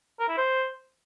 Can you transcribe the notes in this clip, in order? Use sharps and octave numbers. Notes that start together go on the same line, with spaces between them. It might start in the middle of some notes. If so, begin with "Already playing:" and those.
A#4
E4
C5